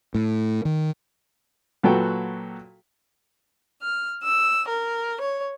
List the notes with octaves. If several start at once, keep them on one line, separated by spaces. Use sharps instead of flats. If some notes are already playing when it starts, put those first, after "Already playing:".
A2
D#3
A#2 F#3 F#4 A4 B4 G5
F6
E6
A#4
C#5